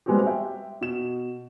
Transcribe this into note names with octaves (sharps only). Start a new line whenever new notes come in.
G3 G#3 B3 C4 F#4 G4
E5 G5
B2 E7